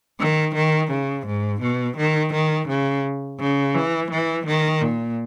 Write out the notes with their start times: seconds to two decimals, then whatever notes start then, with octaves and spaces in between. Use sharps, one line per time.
0.20 D#3
0.55 D#3
0.91 C#3
1.26 G#2
1.61 B2
1.97 D#3
2.33 D#3
2.68 C#3
3.40 C#3
3.75 E3
4.11 E3
4.46 D#3
4.81 A#2